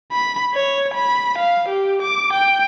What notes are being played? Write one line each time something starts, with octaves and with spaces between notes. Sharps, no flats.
B5
C#5
B5
F5
G4
D6
G5